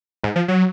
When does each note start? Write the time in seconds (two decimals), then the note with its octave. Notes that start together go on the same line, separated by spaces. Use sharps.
0.24 G#2
0.36 F3
0.48 F#3